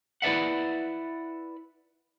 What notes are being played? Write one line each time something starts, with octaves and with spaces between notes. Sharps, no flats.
E4 B4 D5 E5 F#5